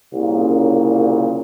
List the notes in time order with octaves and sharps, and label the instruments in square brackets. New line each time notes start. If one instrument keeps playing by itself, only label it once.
[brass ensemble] C2 A#2 C#3